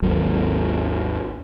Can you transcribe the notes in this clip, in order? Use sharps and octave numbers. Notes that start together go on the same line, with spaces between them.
G#1 D#2 F#3